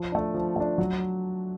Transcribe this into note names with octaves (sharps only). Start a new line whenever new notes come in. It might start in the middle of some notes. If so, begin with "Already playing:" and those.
Already playing: F3
A3 D4
F3
A3 D4
F#3